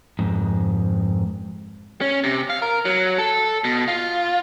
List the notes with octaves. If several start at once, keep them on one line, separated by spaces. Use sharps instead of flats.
F2 G#2
C#4
C3
F5
A#4
F#3
A4
B2
F4